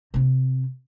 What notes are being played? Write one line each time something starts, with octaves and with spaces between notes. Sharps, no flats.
C3 C4